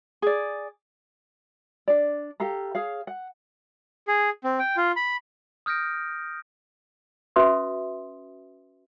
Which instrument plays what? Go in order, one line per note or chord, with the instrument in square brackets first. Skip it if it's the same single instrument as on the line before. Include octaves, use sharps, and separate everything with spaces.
[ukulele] G#4 D5
D4 D5
G4 A4 F5 A#5
G#4 C#5 F5
F#5
[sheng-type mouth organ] G#4
C4
G5
F4
B5
[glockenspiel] D#6 F6 G6 A#6 D7
[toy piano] C#4 F#4 B4 E5 C6 D#6